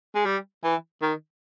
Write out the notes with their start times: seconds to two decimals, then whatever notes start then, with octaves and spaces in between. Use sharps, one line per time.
0.15 G#3
0.25 G3
0.63 E3
1.02 D#3